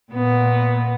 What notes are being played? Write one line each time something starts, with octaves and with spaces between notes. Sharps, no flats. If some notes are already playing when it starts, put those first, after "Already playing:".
A#2 B3